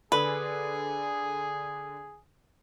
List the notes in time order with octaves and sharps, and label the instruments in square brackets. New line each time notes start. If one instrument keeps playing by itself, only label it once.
[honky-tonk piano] D3 [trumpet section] G#4 [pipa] B4